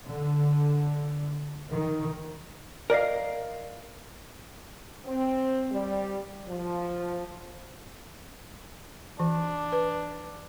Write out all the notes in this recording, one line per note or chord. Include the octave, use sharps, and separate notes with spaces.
D3
D#3
A#4 D5 D#5 F5
C4
G3
F3
E3 D4
B4